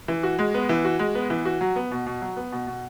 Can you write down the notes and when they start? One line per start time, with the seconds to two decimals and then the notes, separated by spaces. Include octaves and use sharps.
0.08 E3
0.23 F#4
0.39 G#3
0.54 B3
0.69 E3
0.85 F#4
0.99 G#3
1.15 B3
1.30 E3
1.45 F#4
1.61 F#3
1.76 B3
1.92 B2
2.06 B2
2.22 F#3
2.37 B3
2.52 B2
2.67 B2